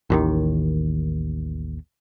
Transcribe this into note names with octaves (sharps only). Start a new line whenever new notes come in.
A1 D#2 D#3